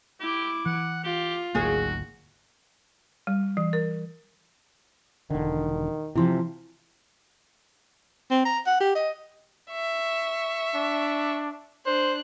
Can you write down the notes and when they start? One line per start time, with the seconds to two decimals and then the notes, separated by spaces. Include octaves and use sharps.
0.20 E4 G4 D6
0.66 E3 F#5
1.04 F4 G4
1.55 G#1 D2 D#3 F#3 A#3 F#4 G#4
3.27 G3
3.57 E3
3.73 A#4
5.31 E1 D3 D#3
6.15 C3 E3 F3 E4 C6
8.31 C4
8.45 A#5
8.66 F#5
8.80 G4
8.95 D#5
9.71 E5 C#6
10.75 D4
11.86 D4 C5 F#6